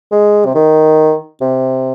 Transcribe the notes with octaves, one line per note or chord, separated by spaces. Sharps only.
G#3
C3
D#3
C3